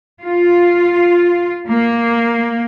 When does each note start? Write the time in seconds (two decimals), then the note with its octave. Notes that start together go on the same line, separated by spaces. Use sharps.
0.23 F4
1.69 A#3